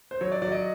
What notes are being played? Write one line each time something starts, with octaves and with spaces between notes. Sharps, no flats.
C5
F#3 C#5
D5
F#3 D5
D#5